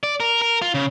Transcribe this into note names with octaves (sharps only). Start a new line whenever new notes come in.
D5
A#4
A#4
F4
C#3